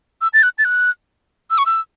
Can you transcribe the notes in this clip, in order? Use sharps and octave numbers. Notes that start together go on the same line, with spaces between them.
E6
A6
F#6
A6
F#6
E6
C#6
E6